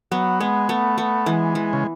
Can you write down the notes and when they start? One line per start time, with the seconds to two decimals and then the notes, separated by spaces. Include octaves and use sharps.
0.11 F#3 B3
0.40 G#3 B3
0.69 A3 B3
0.98 B3
1.26 E3 G#3
1.55 E3
1.73 C#3